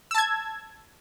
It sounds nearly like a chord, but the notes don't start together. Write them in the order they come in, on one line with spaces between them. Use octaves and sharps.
E6 A5 G#6